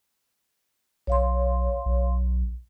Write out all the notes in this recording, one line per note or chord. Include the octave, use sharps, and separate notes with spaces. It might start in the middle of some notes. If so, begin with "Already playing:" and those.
B1 C#5 F5 C6
B1